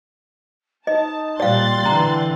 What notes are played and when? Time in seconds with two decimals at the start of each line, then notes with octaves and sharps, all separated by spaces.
0.87 D#4 D#5 A5
1.40 A#2 G3 D5 F5 G5 C6 F#6 A6
1.86 D3 E3 A#5